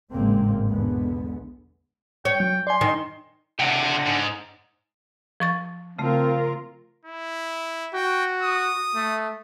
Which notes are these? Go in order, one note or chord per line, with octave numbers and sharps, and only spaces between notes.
G#1 A2 C#3 G#3 A#3 C4
B1 E2 D3 G#3 B3
C#5 G5
F#3
D5 G#5 C6
D#3
C3 D4 F#5 G5
G#2
F3 C#6 A6
C#3 A3 C4 F4 A#4
E4
F#4 G5
D#6
A3